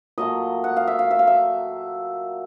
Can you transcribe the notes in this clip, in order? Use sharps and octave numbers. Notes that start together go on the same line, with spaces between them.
A#2 F#3 A3 D#5
F#5
F5
E5
F5
E5
F5
E5